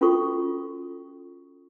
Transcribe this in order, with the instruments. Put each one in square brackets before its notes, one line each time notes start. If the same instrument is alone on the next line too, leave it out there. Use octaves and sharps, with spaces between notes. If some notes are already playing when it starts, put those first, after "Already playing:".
[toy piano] C#4 F4 F#4 A4 C#6 D#6